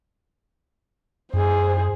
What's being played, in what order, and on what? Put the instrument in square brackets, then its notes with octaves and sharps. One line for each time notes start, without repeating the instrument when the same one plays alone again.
[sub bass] F#2 [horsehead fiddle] G#4 C5